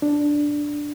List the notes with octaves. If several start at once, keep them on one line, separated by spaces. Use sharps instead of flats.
D4